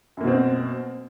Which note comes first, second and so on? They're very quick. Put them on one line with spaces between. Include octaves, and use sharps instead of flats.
F#2 A#3 B2 C4